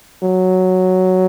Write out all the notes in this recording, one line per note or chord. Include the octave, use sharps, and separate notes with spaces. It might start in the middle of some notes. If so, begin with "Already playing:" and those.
F#3